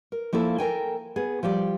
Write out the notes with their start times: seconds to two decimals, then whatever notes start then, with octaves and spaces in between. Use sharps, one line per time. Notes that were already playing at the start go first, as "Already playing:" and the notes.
0.12 A#4
0.33 F3 A#3 E4 A4
0.58 A4 A#4 G5 G#5
1.16 B3 G#4
1.43 F3 G3 G4 D5